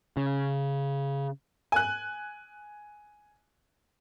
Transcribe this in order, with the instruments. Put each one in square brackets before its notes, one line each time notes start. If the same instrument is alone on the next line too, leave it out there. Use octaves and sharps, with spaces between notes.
[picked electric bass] C#3
[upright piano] G#5 F#6